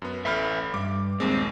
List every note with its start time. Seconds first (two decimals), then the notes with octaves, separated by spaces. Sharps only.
0.02 F#2 B3
0.25 A1 A4 B4 E5 B5 F6
0.74 G2 D6
1.20 A#1 D#2 G#3 C4